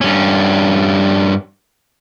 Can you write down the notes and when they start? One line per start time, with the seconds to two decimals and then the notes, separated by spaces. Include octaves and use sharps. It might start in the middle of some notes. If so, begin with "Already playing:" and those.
0.01 G2 C#4